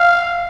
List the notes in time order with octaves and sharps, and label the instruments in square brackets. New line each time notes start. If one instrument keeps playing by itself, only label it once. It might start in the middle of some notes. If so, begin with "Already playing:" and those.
Already playing: [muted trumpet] F5